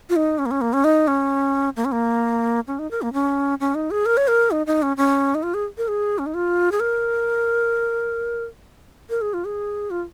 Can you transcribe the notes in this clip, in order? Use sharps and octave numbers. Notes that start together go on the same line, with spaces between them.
F4
D#4
C#4
A#3
C#4
A#3
C#4
D#4
C#4
A#3
C#4
A#3
C#4
D#4
A#4
A#3
C#4
C#4
D#4
G#4
A#4
C#5
A#4
D#4
D#4
C#4
C#4
D#4
F4
G#4
A#4
G#4
C#4
D#4
F4
G#4
A#4
A#4
G#4
F4
G#4
F4